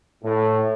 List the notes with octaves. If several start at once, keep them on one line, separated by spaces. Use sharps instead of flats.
A2